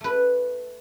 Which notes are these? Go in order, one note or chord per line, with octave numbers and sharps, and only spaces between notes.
A3 B4